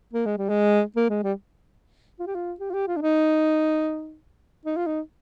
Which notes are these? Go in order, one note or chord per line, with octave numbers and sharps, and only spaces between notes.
A#3
G#3
G3
G#3
A#3
G#3
G3
F4
G4
F4
G4
F4
G4
F4
D4
D#4
D#4
F4
D#4